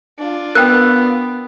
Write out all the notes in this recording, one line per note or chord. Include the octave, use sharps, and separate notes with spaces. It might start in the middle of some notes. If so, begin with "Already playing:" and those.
D4 F4
B3 A#4 G5 F#6